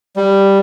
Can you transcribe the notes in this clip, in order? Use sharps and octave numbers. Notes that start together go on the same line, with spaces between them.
G3